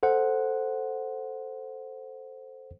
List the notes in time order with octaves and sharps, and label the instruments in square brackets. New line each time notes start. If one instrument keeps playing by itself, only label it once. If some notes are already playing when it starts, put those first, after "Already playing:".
[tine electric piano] A4 C5 F#5